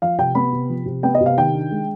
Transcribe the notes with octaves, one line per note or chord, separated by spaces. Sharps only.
F3 F5
C3 G5
B3 B5
C3
F3
C3
B3 G5
D#5
C3
F5
D#3 G5
D4
G#3